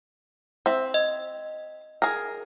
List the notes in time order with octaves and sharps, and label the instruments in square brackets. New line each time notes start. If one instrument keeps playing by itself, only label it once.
[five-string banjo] C4 E5
[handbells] D#5
[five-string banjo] G#4 A#4